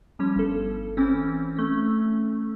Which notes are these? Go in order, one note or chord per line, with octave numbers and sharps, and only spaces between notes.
F3 G3 C#4
G1 A4
E3 C4 C#4
A3 C#4